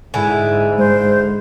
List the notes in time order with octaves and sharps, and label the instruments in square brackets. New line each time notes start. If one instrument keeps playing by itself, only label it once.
[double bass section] G#2 [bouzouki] D3 E4 G#4 [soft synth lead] G#5
[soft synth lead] G#3 [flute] C5